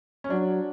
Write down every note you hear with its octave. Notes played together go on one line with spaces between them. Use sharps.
C#4
F#3 D4